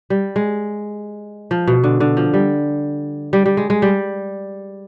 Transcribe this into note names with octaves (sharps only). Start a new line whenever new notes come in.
G3
G#3
F3
B2
D3
D3
F3
G3
G3
G3
G#3
G#3
G3